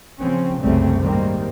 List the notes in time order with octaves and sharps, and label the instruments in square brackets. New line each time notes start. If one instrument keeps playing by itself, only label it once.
[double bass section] C#3 F3 C4 C#4
F#1 C2 C#3 G3 A3 C4
G#2 D#3 G3 A#3 C4